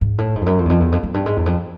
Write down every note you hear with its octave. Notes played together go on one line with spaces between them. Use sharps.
G#2
A2
G#2
F2
F#2
F2
E2
F2
E2
F2
F#2
G2
G#2
E2
F2